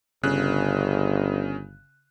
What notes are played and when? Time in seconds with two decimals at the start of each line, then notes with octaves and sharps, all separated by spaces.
0.23 G1 C#3 F#6